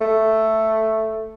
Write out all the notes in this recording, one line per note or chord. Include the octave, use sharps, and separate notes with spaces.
A3